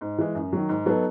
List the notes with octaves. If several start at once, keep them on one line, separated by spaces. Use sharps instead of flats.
G#2
E3 G#3
F#2
D#3 F#3
G#2
F#3 B3 D#4 A4